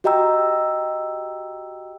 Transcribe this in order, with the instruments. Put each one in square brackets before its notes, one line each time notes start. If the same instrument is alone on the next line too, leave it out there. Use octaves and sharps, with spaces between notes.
[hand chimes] F#4 G4 D#5 G5 A#5 E6